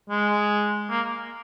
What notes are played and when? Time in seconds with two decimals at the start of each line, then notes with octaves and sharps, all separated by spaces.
0.10 G#3
0.90 A#3